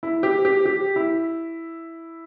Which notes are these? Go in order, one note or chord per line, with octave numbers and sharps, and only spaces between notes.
E4
G4
G4
G4
E4